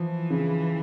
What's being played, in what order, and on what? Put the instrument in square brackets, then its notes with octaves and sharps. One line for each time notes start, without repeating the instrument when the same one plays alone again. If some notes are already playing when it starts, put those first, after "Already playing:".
Already playing: [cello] E3 [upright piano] F3
[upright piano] C#3